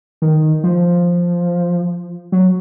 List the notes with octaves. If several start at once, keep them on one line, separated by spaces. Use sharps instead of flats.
D#3
F3
F#3